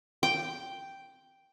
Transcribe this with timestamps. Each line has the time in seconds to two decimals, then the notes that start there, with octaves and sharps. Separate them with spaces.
0.23 G5